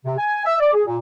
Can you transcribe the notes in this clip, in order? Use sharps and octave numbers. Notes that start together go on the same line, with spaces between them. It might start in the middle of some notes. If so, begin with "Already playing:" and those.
C3
G#5
E5
D5
G#4
A#2